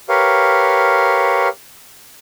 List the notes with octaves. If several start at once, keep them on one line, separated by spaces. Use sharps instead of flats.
G4 A#4 B4 C#5 F5